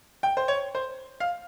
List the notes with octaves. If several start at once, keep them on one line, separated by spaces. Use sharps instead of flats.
G5
C5
C#5
C5
F5